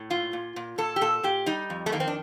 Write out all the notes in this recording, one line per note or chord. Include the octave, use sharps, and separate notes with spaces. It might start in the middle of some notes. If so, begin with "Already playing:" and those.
Already playing: A2
A#2 F4
A#2
A#2
A#2 A4
G4
A#2 A4
A#2 G4
G3 D#4
F2
A3
D#3 A#3
C4
D4